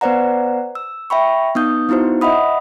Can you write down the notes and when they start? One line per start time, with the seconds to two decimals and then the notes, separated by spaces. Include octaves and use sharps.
0.01 B3 B4 C5 D5 F#5 A#5
0.75 E6
1.10 E5 G5 B5 C#6
1.55 B3 D#4 D#6 G6
1.89 B3 D#4 E4 F#4 C5
2.21 D#5 E5 F#5 B5 D#6